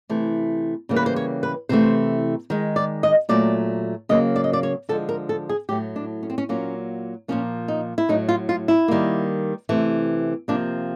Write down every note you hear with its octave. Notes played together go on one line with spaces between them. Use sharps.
C3 E3 A3
C#3 E3 G3 A#3
B4
C5
C#5
B4
C3 E3 A3 C5
D#3 G#3
D5
D#5
A#2 F#3 A3 D5
C#3 F#3 A#3 D#5
D5
D#5
D5
C#5
D3 F3 G#3 A4
A#4
A4
G#4
A2 F#3 A3 G4
D4
C#4
C4
C#4
A#2 F#3 A#3 C#4
A#2 F3 A#3 C#4
D#4
E4
A2 F#3 A3 D#4
F4
F4
E4
D#3 G3 A#3
C3 E3 A3
C3 F3 A#3 D4